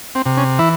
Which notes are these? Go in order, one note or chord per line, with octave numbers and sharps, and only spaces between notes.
C4
C3
C#4
E3 E4